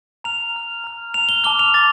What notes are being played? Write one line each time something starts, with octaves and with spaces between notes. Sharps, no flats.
A#5 F6 F7
A#5 F6
A#5 F6
A#5 F6 F7
G7
A5 D6 F6 G7
F7
A5 D6 F6 A6